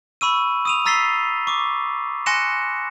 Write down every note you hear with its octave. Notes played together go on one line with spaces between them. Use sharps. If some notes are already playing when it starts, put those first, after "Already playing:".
B5 C#6 E6 D#7
D#6 D#7 F7
A#5 E6 A6 B6 C7 G7
C#6 D6
G#5 C6 F#6 A#6 C#7 E7